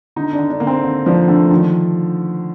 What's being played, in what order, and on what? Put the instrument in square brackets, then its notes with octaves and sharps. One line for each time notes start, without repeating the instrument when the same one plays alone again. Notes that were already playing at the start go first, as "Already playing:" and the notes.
[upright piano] D3 [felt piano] D#4
[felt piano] D4
[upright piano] D3
[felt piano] D4
[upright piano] D3 [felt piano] A#3
[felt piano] C4
[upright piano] D3
[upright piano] F3 [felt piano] D4
[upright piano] D3 [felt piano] A3
[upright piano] D#3 [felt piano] F3